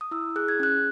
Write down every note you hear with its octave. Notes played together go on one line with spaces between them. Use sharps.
D#6
E4 E6
G#4 F#6
G#6
C#4 F#6